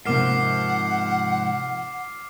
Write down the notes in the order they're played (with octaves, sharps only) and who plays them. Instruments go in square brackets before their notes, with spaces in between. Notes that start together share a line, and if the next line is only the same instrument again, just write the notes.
[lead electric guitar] G#2 F3 [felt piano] C3 A#3 [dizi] F#5 [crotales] D6 F6 C7